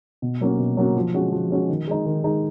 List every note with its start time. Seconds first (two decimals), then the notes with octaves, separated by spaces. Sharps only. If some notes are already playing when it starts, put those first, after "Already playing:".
0.22 B2
0.41 F#3 A#3 C#4 F#4
0.59 B2
0.77 F#3 A#3 C#4 F#4
0.96 F3
1.14 G#3 C#4 F#4
1.32 F3
1.51 G#3 C#4 F#4
1.69 D#3
1.88 G#3 D#4
2.06 D#3
2.24 G#3 D#4